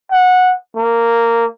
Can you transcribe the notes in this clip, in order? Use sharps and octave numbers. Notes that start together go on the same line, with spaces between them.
F#5
A#3